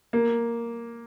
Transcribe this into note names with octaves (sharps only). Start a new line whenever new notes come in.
A#3